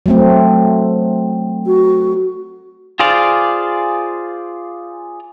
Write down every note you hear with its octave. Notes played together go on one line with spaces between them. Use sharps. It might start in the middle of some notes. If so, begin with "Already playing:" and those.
F#3 A3 C4
F#4
F4 G#4 C5 D5 F5